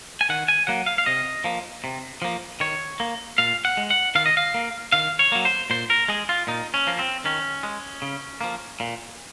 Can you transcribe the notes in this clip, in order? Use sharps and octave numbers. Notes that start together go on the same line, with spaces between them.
G#5
D#3 F#5
G#5
F#3 A#3 F#5
F5
F5
C3 D#5
F3 A#3
C3
F3 A#3
D#3 C#5
A#3
A#2 F5
F#5
G#3
F#5
D#3 F5
D#5
F5
A#3
D#3 F5
C#5
F#3 A#3
C5
A#2 C5
A#4
G#3 G#4
F4
A#2 D#4
C#4
F3 A#3
C4
D#3 C#4
G#3
C#3
F3 A#3
A#2